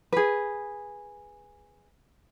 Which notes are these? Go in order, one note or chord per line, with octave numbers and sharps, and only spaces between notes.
G#4 B4